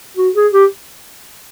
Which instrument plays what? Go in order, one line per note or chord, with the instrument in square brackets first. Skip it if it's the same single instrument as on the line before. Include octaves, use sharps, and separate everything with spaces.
[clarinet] F#4
G#4
G4